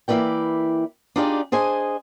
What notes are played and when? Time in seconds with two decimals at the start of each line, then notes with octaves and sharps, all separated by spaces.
0.08 E3 A#3 E4 B4 D5 G5
1.16 D4 D#4 F4 G4 G#4 D5
1.52 D4 G#4 C5 D#5 G#5